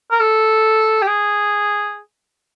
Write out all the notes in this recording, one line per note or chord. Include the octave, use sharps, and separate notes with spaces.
A#4
A4
G4
G#4